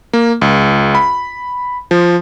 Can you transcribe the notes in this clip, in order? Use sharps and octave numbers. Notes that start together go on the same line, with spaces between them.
A#3
C#2
B5
F3